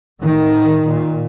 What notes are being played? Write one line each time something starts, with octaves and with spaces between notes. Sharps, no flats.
A2 D#3
A#2